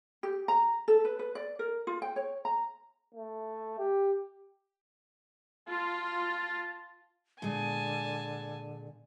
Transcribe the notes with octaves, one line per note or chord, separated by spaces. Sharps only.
G4
A#5
A4
B4
B4
D5
A#4
F4
G5
C#5
A#5
A3
G4
F4 A5
A#2 D3 G#3 G#5 A5